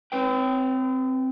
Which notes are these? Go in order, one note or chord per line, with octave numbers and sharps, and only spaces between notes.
C4 B4 G5